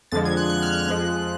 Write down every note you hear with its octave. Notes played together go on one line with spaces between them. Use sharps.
F2 D3 F3 G#3 A6
G#6
F#6
F#6
F6
F#6
F2 F3 G#3